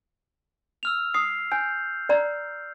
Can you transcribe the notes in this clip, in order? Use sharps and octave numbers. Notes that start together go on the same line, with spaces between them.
E6 F6 F7
D#6 C7
G#5 G6
D5 A#5